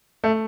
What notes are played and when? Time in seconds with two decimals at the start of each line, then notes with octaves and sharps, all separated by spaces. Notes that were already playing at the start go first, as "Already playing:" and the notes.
0.24 A3